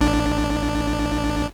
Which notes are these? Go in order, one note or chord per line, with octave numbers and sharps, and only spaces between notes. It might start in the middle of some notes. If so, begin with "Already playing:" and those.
A1 D4